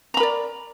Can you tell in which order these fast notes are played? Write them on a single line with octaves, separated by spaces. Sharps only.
A#5 B5 A#4 D5